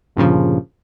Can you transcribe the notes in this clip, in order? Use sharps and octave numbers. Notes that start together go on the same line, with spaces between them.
G1 G2 A#2 C#3 F3